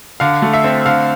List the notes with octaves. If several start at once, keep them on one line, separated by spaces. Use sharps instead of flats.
D3 F5
A3
E5
C4
D3 F5